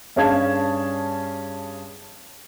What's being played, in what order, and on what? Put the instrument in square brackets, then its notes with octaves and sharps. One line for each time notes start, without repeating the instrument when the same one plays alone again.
[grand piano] G2 C#4 G#4 F5 A5 G#6